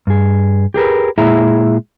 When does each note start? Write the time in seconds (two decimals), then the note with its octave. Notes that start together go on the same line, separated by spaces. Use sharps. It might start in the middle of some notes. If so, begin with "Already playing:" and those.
0.07 G2 G#4
0.74 G4 G#4 A#4 B4
1.18 A#2 G#3 E4 G#4 E5 A#5